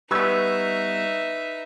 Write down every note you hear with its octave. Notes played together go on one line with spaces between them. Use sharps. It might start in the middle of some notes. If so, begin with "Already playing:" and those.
G3 B3 D#4 B4 E5 C#6 E6 G#6